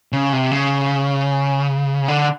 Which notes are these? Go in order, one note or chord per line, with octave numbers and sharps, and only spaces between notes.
C#3
C3
C#3
D3